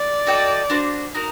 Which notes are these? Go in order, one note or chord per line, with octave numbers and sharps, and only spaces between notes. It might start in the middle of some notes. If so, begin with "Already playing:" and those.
Already playing: D5
F#4 A4 D#5 G5
D4 F#4 C5
D#4 F#4 A#4